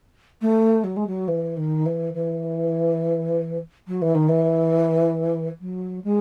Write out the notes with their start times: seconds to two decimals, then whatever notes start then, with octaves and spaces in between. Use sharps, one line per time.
0.41 A3
0.84 F#3
0.96 G#3
1.07 F#3
1.28 E3
1.57 D#3
1.86 E3
2.14 E3
3.87 F#3
4.02 E3
4.15 D#3
4.28 E3
5.61 F#3
6.04 G#3